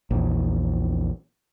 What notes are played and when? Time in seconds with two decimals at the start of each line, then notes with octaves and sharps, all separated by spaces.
0.11 A#1 E2